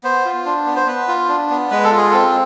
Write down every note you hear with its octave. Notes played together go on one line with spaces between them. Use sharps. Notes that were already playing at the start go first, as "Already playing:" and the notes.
B3 C5
F4
D4
B3
C5
B3 B4
F4
D4
B3
G#3 B4
A4
F4
G#4
C4 A4